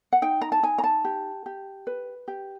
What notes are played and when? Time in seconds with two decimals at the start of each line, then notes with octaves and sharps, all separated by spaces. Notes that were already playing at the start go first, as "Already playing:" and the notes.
0.13 F#5
0.22 D#4 G5
0.42 A#5
0.52 A5
0.63 D#4 G#5
0.78 A#5
0.84 A5
1.05 G4
1.46 G4
1.87 B4
2.28 G4